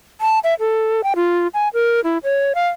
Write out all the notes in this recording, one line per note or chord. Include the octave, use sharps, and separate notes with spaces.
A5
E5
A4
G5
F4
G#5
A#4
E4
C#5
F5